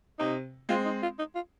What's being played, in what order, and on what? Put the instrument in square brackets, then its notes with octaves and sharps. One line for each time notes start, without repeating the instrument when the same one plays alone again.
[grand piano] C3 [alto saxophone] D#4
[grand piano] G#3 C4 [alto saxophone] F4
[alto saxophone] D#4
F4
D#4
F4